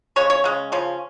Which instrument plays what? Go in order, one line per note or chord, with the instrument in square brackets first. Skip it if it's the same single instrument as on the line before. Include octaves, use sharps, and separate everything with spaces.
[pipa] C#3 G#3 C#4 C#5
C#5
C#3 G#3 C#4
C#3 F3 C#4